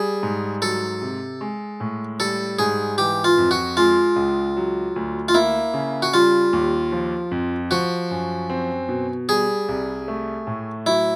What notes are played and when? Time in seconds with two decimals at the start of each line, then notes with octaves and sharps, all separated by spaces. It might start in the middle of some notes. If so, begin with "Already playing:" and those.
Already playing: G3 G#4
0.23 G#2
0.62 F#3 A4
1.02 C3
1.41 G#3
1.80 A2
2.20 G3 A4
2.59 G#2 G#4
2.98 E3 G4
3.24 F4
3.38 F2
3.51 F#4
3.77 G#3 F4
4.16 C#2
4.57 F#3
4.96 D2
5.28 F4
5.34 A#3 E4
5.74 C#3
6.02 F#4
6.14 G3 F4
6.53 D#2
6.92 F3
7.31 F2
7.71 F3 F#4
8.11 F#2
8.50 C4
8.89 B2
9.29 G3 G#4
9.69 C2
10.08 A3
10.47 A2
10.86 F#3 E4